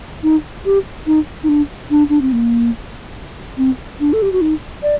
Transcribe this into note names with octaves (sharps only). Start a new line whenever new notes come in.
D#4
G4
D#4
D#4
D4
D4
D4
C4
A#3
C4
D4
A4
G4
F#4
D#4
D5